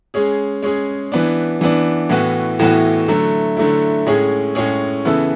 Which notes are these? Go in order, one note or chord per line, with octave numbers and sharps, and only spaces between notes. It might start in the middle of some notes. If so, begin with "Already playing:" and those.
G#3 C#4 G#4
G#3 C#4 G#4
E3 B3 D4
E3 B3 D4
A2 E3 B3 F#4
A2 E3 B3 F#4
D3 F#3 A3 E4
D3 F#3 A3 E4
A2 G#3 C#4 G#4
A2 G#3 C#4 G#4
C#3 E3 B3 E4 A4